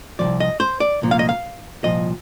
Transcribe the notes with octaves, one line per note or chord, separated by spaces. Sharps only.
C2 A#2 F3 D5
D#5
C5
D5
C2 A#2 F3
F5
D#5
F5
C2 A#2 F3 D#5